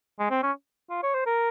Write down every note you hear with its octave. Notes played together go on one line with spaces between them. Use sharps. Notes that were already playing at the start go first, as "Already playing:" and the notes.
G#3
C4
C#4
F4
C#5
C5
A#4